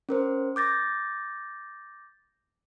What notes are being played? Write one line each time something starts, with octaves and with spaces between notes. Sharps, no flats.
C#4 A#4 C5
D6 G6 A6 A#6